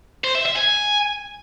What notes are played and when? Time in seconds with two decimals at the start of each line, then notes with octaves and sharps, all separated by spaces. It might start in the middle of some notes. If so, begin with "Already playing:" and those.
0.24 C5
0.35 E5
0.45 E5
0.56 G#5